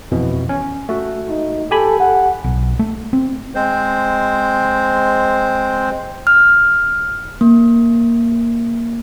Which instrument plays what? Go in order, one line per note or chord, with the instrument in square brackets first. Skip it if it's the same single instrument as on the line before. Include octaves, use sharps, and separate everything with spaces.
[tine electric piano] F2 B2 E3
C#4
A3 F#4
[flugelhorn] D#4
[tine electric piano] G4 G#5 B5 [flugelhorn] A4
[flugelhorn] F#5
[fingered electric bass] B1
A3
C4
[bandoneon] G#3 C4 C5
[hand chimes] F6
A#3